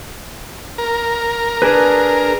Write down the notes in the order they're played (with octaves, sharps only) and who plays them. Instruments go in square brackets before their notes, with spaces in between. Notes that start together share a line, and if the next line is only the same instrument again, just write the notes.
[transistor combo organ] A#4
[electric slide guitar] D4 G#4 B4